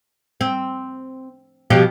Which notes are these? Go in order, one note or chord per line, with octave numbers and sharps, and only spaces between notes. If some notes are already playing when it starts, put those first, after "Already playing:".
C4
B2 F3 G4